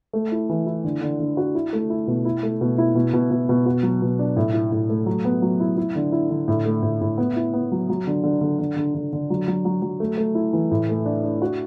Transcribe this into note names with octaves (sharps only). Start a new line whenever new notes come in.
A3
E4
E3
E4
D3
D3
D3
F#4
E4
A3
E4
B2
E4
A3
B2
E4
B2
B2
B2
B2
F#4
F#3
B2
D4
A2
E4
A2
A3
F#3
B3
F#3
E4
E4
D3
E4
D3
A2
A3
A2
A2
B3
E4
B3
F#3
F#3
D3
D3
D3
D3
D3
D3
D3
F#3
F#3
F#3
F#3
A3
A3
E4
E3
A2
A3
D4
D4
F#4